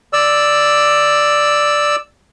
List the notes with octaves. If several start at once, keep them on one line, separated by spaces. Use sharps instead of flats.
D5 E6